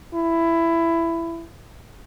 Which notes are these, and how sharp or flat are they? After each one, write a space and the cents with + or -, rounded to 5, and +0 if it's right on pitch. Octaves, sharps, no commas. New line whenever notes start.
E4 +15